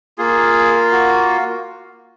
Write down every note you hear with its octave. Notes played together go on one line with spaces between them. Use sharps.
A#3 F4 G#4
F#4